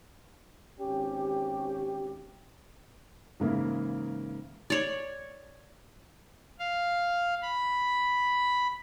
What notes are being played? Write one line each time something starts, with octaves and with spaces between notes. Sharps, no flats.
G#1 C#4 G4
G#2 C#3 E3 A#3 E4
C#5 D5
F5
B5